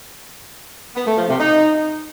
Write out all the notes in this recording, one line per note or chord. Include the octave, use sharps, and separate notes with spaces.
B3
A3
F3
C3
D#4